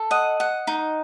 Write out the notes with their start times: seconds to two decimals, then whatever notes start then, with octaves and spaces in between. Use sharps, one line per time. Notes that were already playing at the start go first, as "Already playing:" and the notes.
Already playing: A4
0.11 D#5 F#5
0.40 F#5
0.67 D#4